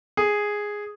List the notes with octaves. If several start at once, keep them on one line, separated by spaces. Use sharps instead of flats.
G#4